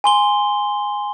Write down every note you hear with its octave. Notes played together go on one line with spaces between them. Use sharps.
G#5 C6 G7